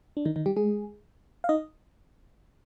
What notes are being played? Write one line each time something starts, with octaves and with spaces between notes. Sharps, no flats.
D4
D#3 D#4
D#3 D#4
G3 G4
G#3 G#4
F5
D#4 D#5